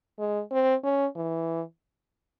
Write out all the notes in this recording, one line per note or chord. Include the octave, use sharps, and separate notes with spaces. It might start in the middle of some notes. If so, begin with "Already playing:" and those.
G#3
C4
C#4
E3